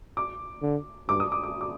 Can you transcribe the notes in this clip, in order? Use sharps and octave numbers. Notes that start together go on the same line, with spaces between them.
D6
D3
G2 D6
D#6
D6
D6
D6